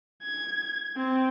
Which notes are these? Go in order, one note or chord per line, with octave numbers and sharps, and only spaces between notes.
G#6
C4